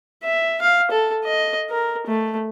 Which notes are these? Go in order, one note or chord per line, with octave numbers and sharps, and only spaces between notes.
E5
F5
A4
D#5
A#4
A3